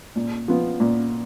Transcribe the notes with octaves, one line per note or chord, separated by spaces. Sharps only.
A#2
F3 B3
A#2